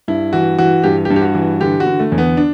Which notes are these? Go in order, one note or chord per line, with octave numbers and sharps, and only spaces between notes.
G2 E4
E3 F#4
E3 F#4
G2 G4
G4
G2
G4
F#4
E3
D3 G4
F#4
D3
A3
E2
B3
D4